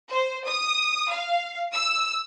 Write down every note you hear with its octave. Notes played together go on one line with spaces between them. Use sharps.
C5
D#6
F5
E6